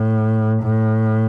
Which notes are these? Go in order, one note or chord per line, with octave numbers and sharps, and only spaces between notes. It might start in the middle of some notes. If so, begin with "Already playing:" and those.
Already playing: A2
A2